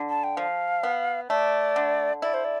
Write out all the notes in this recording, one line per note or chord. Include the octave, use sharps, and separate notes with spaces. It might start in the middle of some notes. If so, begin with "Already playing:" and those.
Already playing: D3
A5
G5
F3 F5
B3
A3 D5
D3
E4 D5
C5
D5